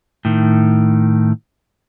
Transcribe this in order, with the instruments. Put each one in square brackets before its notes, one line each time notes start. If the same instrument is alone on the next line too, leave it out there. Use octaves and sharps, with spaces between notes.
[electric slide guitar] A2 D#3